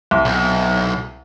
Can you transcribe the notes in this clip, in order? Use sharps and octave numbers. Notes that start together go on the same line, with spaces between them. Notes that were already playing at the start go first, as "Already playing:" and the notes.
C2
B1